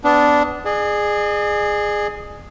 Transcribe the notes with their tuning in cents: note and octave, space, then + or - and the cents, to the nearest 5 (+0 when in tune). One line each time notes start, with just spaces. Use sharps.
B3 +20 D4 -5
G#4 +0 D5 +45